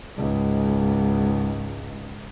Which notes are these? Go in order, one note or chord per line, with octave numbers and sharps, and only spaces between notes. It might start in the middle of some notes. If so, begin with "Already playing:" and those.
C#2 G#2